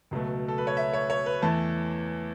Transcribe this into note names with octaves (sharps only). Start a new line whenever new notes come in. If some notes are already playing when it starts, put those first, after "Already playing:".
C#2 B2 F#3 A3
A4
B4
C#5
E5
C#5
C#5
B4
E2 E3 A3 A5